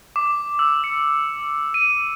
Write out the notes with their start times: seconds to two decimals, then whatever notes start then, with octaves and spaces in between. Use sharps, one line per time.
0.16 D6
0.59 E6
0.84 C#7
1.74 D#7